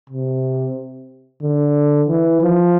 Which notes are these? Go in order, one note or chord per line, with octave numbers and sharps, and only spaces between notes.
C3
D3
E3
F3